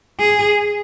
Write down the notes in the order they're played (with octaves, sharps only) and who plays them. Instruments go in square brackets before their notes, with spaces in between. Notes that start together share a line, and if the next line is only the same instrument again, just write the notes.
[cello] G#4